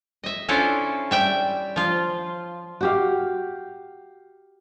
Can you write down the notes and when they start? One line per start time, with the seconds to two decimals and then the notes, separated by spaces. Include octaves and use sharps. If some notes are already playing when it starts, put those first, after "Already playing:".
0.24 D#5 E5
0.48 C#4 D4 E4 F4 A4 C5
1.11 G3 E5 G5
1.76 F3 F4
2.81 F#4 G4 F5